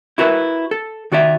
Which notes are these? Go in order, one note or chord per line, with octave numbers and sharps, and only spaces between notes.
E4 F#4 A#4 B4 E5
A4
D#3 F#4 D5 E5